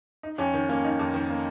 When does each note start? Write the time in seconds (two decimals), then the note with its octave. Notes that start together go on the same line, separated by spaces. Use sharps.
0.23 D#4
0.38 F2 C#4
0.54 D#3
0.69 A#3 C#4
0.84 D#4
0.99 F2
1.14 D#3
1.30 A#3